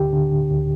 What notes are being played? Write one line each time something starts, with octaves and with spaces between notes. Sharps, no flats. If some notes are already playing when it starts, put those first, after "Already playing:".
Already playing: D2 D3 G4
D3
D3
D2